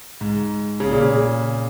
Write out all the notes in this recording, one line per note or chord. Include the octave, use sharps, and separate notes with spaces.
G#2
C#3
A#2
C#3